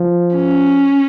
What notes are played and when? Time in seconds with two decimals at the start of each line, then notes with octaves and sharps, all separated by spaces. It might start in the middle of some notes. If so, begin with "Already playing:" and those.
Already playing: F3
0.36 C#4